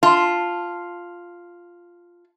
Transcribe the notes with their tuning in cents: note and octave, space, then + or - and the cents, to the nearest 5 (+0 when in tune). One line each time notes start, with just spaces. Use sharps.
F4 +0 A5 +0